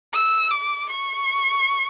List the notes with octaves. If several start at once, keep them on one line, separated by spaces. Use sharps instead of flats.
E6
D6
C#6